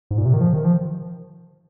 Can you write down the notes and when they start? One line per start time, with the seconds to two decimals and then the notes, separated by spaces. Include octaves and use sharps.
0.11 G#2
0.18 A#2
0.26 C3
0.34 D#3
0.41 F3
0.54 D#3
0.65 F3